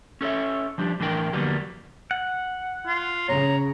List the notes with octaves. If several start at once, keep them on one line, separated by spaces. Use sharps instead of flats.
C#4 A4 C#5 E5
F3 G3 D4 G4
A2 E3 D4 A#4 G5
F2 D3 F#3 G3 A#3 B3
F#5
F4
C#3 C#5 A#5